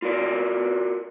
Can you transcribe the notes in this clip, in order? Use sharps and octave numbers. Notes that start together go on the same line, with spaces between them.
F4 F#4 A#4 D5